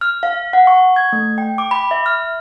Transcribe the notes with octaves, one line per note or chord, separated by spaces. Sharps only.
F6
F5
F#5
C#6
G#6
A3
G5
D6
B5
E5
F6